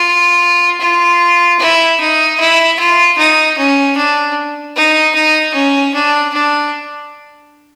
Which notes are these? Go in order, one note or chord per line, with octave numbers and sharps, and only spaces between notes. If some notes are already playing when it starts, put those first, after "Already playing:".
Already playing: F4
F4
E4
D#4
E4
F4
D#4
C#4
D4
D#4
D#4
C#4
D4
D4